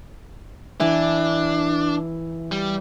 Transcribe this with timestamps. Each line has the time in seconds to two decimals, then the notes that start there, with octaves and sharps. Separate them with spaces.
0.80 E3 D4
2.52 G3